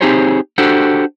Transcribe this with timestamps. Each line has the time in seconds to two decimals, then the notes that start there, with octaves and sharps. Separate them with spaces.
0.01 C4 D#4 G4 G#4 C5 C#5
0.58 D4 F#4 G4 A4 C5